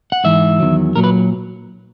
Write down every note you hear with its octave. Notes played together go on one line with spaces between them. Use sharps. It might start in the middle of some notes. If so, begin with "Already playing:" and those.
F#5
G#2 E3 E5
E2 D#3 F#3
A#2 F#3 A#4
B4